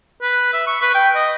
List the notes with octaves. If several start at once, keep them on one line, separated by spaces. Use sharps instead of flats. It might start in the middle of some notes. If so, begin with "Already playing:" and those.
B4
E5
C#6
B4
G5
D#5